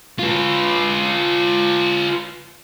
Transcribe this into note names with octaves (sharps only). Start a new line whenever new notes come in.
F4 B4